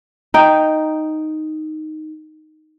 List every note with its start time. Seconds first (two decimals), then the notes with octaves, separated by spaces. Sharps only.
0.34 D#4 G5